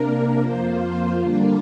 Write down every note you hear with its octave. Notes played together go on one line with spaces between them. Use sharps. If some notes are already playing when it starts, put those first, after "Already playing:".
Already playing: C3 A#3 D4 A#4
F2 F3 A#3 F4 C5
D3 G3 A#3 D4 F4